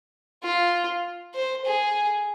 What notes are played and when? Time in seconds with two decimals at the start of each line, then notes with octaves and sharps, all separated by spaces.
0.43 F4
1.34 C5
1.65 G#4